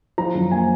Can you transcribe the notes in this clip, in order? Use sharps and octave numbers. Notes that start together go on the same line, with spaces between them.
F3 A#5
F#2
A#3 G#5